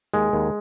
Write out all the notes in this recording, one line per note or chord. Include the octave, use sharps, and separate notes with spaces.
D#2 G#3
D#2